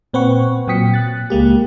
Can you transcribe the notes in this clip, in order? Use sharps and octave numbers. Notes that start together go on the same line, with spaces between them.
A#2 C4 B4 F#5 C#6
A#2 F#3 G5 D#6 B6 C#7
F#6 A6
C#2 G#3 A#3 G4